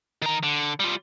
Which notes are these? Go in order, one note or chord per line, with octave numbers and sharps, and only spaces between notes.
D#3 A#5
D3
G3 F4